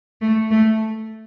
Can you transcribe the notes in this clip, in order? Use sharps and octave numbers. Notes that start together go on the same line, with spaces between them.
A3
A3